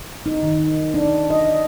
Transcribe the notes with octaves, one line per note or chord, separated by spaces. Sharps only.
D#4
D#3
D4
D#5